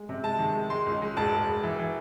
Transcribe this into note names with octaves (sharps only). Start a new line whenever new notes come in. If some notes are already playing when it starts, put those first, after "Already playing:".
Already playing: G#3
C3
G#3 A5
D#3
G#3
G#3 C6
C#2
G#3
E1 A5
E1
E1
E3
E3